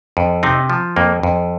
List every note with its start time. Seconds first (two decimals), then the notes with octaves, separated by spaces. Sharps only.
0.17 F2
0.43 C3 C4 D#4
0.70 F3
0.96 F2 A#3
1.23 F2